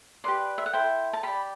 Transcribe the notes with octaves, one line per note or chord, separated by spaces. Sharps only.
G4 B4 D5 C6
E5
F#5
E4 A4 C5 G5
A5
G4 D5 B5